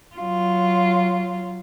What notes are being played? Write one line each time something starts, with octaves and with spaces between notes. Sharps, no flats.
F#3 F4